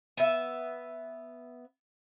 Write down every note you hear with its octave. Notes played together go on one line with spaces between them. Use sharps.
B3 B4 E5